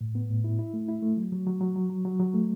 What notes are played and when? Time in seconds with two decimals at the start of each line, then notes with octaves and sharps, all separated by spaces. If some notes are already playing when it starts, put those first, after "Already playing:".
0.01 A2
0.15 B3
0.29 A2
0.44 E4
0.59 E4
0.74 A3
0.88 E4
1.02 A3
1.17 F#3
1.32 F#3
1.47 F#3
1.61 F#3
1.76 F#3
1.90 F#3
2.05 F#3
2.20 F#3
2.34 A3